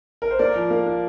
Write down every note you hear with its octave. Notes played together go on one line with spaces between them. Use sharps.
A#4
C5
A#3 A#4 D5
F3
A#3
A#3